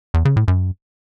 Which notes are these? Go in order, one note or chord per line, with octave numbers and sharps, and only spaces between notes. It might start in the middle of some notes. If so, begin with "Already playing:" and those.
E2
C#3
A2
F#2